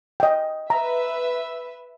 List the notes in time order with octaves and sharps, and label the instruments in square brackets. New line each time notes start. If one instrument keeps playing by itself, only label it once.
[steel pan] D#5 G5
[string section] B4 E5 [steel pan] A#5